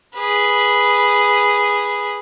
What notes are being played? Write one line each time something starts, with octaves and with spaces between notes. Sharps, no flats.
G#4 B4